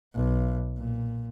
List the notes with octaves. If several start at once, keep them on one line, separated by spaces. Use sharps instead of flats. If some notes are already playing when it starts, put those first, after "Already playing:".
B1
A#2